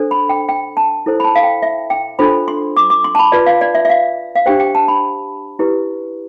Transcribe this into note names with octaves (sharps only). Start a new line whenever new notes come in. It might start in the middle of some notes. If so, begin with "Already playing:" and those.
Already playing: D4 A4 C5
B5
G5
G5
A5
E4 A4 C5
B5
A5
F5
G5
E5
G5
D4 F4 A4 C5 B5
C6
D6
D6
C6
A5
B5
F4 B4 D5
F5
D5
E5
E5
F5
F5
D4 G4 C5 G5
G5
A5
B5
E4 G4 B4